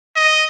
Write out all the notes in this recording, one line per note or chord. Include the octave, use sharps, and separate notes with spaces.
D#5